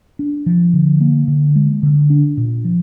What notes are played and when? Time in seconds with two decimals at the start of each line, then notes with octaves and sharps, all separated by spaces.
0.19 D4
0.46 F3
0.74 D3
1.01 A#3
1.28 D3
1.55 G#3
1.83 D3
2.10 D4
2.37 A#2
2.64 F3